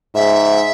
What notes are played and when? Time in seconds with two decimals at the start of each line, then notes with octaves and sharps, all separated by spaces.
0.15 G#2 E5